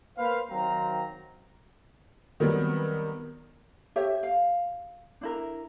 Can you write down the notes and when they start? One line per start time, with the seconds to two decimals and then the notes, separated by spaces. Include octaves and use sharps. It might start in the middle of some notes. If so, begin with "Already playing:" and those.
0.17 A#3 B4 C5 F5
0.50 D#3 F#3 C4 C5 F5 A#5
2.40 D#3 F#3 G3 B3 C4
3.96 G4 C#5 E5
4.23 F5
5.21 D4 E4 A#4